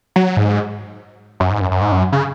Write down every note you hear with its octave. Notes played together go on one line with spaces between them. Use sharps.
F#3
G#2
F#2
G#2
F#2
F#2
G#2
F#2
C#3